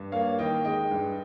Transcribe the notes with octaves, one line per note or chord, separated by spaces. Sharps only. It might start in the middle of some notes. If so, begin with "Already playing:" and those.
Already playing: G2
A#3 C#5 F5
D#3 D#5 G5
G#3 D#5 G5
G2